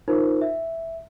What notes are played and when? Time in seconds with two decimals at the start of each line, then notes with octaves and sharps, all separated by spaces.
0.08 D#4 F4 A#4 C5
0.41 E5